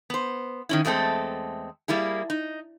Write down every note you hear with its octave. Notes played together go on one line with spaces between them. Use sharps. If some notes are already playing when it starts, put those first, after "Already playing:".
B3 C5
D#3 C#4 E4
E2 G#3 A3 C4 A4
G3 A#3 E4 G#4
D#4